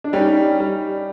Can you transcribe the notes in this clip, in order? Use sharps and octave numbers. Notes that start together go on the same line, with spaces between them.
D4
G3 C#4 D#4
G3